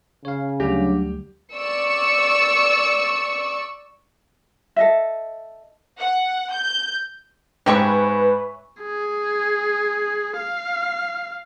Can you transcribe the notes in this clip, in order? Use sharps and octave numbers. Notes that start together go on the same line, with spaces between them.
C#3 C#5 F5
D2 F#3 G3 D4 G4
D5 C#6 E6 C#7
A4 D#5 E5
F#5
G6
G#2 C4 G4 B4 C#5 E5 G#5 C#6
G#4
F5